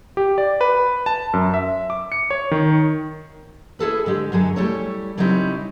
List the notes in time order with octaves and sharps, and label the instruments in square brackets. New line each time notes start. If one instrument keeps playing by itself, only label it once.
[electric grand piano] G4
D5
B4
A5
F#2
E5
D6
C#7
C#5
D#3
[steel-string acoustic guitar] E4 G#4 A4 B4
D3 G#3 G4
F#2 D3 F#3 G#4 A4
G3 A3 E4 C#5
C#3 F#3 G3 C4 D#4 E4